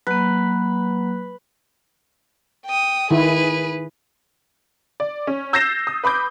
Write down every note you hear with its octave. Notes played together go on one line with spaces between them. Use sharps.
F#3 A#3 B4
G5 D#6
D#3 E4 G#4 B4
D5
C#4
E6 G6 A6 A#6 C7 E7
D#6
B4 B5 D6 G6